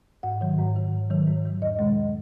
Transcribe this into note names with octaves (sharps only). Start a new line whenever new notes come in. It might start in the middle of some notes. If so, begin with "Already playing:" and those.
G#2 F#5
D#3 F#3
G#2
D#3 F#3
G#2
D#3 F#3
G#2
D#3 F#3
E2 D#5
B2 G#3